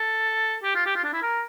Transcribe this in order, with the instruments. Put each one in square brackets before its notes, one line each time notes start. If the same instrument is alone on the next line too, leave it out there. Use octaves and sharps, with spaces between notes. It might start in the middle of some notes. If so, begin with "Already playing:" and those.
Already playing: [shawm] A4
G4
F4
G4
F4
D4
E4
A#4